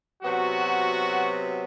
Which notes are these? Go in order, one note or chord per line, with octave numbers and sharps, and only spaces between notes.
C3 F#3 B3 F#4